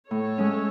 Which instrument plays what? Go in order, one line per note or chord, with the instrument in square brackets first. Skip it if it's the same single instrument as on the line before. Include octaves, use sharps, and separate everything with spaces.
[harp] A2 [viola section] A4 C#5
[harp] G#3 C#4